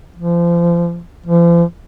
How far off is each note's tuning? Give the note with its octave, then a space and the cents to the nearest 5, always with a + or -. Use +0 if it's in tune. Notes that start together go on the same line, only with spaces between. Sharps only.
F3 -30
F3 -45